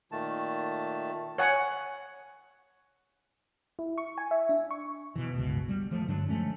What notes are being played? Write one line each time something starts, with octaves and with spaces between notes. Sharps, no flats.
A#2 D#3 A3 A5
C#5 F#5 G#5
E4
C#6
G#5
E5
D4
C#6
B2 E3
G1 C#2 B2
G3
E3 F3 A3
G2 D3 F#3 D4
F3 G#3 A3 C#4